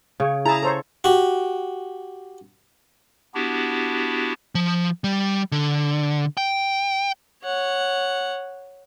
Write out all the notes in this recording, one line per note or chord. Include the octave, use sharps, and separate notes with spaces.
C#3 C#5
E4 G#4 A5 A#5
A4 C5 C#5
F#4 G4
B3 D4 E4 F#4 G4
F3
G3
D3
G5
C#5 F#5